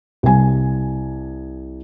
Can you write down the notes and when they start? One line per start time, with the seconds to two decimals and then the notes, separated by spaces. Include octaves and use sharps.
0.23 C2 G#5